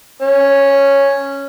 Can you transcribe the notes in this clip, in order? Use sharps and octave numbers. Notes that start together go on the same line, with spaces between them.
C#4